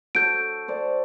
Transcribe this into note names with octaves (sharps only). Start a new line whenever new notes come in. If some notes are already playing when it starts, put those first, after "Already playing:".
F#4 A4 C#5 G6 D7
C5 D5 A5